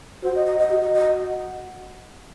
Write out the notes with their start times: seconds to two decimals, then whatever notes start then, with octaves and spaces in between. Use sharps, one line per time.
0.23 F#4 C5
0.35 D#5
0.46 D#5
0.59 D#5
0.70 F#4
0.82 D#5
0.94 D#5